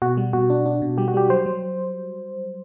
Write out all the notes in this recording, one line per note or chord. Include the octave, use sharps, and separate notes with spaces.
B2 F#4
G3
B2 F#4
D4
D4
B2
G3 G4
F#4
G3 G4
F#3 C5
F#3